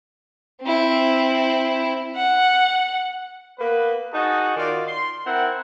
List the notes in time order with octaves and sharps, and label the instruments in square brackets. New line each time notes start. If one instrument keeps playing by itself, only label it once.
[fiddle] C4 E4
[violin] F#5
[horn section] A#3 B3 B4
D#4 F#4 G#4 F#5 A5
D#3 F4 F#4 D5
C6
C4 E4 A#4 F#5